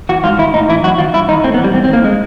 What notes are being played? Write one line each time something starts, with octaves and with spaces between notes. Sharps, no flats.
E3 F#4
G#2 F4
D#3 E4
A2 D#4
E3 E4
F#2 F#4
D#3 F4
G2 E4
D#3 D#4
A2 C4
B3
E3
G3
G#2 C4
C4
D#3 A#3
G#3